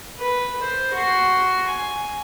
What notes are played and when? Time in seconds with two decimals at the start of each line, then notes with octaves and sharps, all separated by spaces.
0.18 B4
0.61 C5
0.93 F#4 C6
1.67 G#5